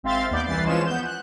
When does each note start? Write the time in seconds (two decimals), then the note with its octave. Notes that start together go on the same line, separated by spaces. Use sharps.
0.03 G#1 C4 E5 F5 C6 A6
0.30 D#2 B3 D5 D6 G6
0.45 C2 E3 B4 A6 C7
0.64 E3 F3 G#3 C#4 F4 E7
0.86 B3 G6
1.05 F#6